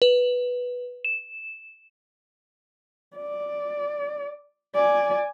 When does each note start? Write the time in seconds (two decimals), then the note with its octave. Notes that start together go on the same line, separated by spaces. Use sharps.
0.02 B4
1.05 E7
3.17 D5
4.75 D5 G#5